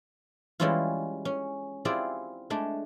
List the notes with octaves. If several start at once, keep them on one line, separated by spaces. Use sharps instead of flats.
E3 G3 G#3 C#4 E4 F4
C#4
C4 E4 F4 G4 G#4 D5
G#3 A3 D4